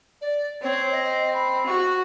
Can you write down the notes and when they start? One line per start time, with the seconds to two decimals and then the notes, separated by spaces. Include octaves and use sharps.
0.21 D5
0.63 C4 C#5
0.92 D#5
1.34 B5
1.67 F#4 C#6